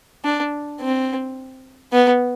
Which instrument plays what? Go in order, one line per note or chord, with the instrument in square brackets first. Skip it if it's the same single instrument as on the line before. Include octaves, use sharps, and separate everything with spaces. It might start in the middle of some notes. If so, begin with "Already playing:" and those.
[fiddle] D4
C4
B3